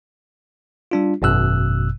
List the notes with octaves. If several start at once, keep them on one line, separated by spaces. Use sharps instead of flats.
G3 D4 F4
G#1 F#2 B2 E6 F#6